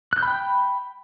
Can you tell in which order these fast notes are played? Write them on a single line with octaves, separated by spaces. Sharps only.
F#6 G6 B5 G5